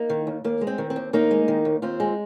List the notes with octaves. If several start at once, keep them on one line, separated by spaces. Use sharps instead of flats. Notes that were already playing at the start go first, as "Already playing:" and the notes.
Already playing: A#3 D#4
D#3
D#2
D#2 A#3
G#3
C4
D#3
C4
D#2
D#2 A#3 D#4
G#3
D#3
D#2
D#2 C4 F4
G#3